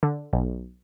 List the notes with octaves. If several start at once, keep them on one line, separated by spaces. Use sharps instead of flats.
D3
B1